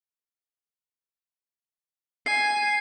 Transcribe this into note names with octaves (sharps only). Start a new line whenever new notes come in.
G#5 C7